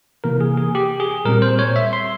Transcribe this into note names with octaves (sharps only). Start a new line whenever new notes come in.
C3 E3 A#3 A#4
G#4
G#4
G4
G#4
A#2 G3 C4 A#4
C5
C#5
E5
C6